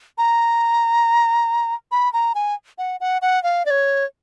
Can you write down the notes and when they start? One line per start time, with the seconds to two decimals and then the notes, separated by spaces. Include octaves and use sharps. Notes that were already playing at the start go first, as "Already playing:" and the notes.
0.18 A#5
1.92 B5
2.13 A#5
2.35 G#5
2.78 F#5
3.00 F#5
3.22 F#5
3.43 F5
3.66 D5
3.70 C#5